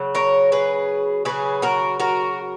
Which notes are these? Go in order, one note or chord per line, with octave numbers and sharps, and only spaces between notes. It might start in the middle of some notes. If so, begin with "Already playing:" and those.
Already playing: C#3 F#3
A#4 C#5
G#4 B4
C#3 F#3 G#4 B4
F#4 A#4
F#4 A#4